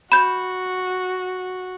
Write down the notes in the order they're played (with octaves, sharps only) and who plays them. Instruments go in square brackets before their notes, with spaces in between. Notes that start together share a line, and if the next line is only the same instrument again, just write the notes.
[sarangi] F#4 [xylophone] B5 G6